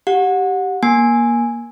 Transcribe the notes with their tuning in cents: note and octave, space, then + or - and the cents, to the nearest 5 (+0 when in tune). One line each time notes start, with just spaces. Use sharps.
G4 -10 F#5 -25
A#3 +20 G#5 +0